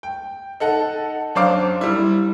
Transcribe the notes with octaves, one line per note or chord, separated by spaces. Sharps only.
G5
D#4 A4 F#5
F#2 D4 C5 F5 D6
G3 E4